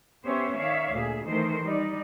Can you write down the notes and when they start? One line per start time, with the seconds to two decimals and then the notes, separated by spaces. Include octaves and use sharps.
0.26 B3 C#4 G4 C5 C#5 E5
0.55 D#3 C#5 D5 E5 F5
0.93 D2 A#2 G#4 E5
1.27 D#3 E3 A3 D#4 A#4 C5
1.63 G3 D#4 D5